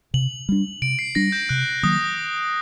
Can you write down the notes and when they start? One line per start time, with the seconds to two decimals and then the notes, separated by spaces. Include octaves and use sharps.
0.14 C3 F#7
0.49 G3 D4
0.82 C3 D7
0.99 C7
1.15 G3 D4 A#6
1.32 G6
1.49 C3 F#6
1.83 D#3 F#3 A#3 D#6